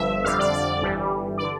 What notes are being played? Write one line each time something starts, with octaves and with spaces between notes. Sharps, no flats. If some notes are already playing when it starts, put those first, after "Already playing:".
Already playing: G1 G2 F3 E5
F2 D3 G3 F5
D5
D5
G1 G2 E3 G3
D5
D3